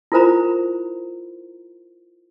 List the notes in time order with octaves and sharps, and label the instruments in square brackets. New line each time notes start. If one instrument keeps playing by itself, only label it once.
[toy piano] E4 F4 A#4 C5 A#5 B5